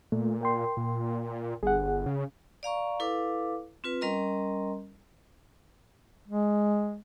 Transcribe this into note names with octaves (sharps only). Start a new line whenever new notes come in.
A#2 A3
A#4 G5 C6
A#2
G1 G#4 F#5
C#3
D5 F5 A#5 C#6
E4 A4 B4 F5 D6
C4 F4 B4
G3 C#4 A#4 D#5 A#5 C6
G#3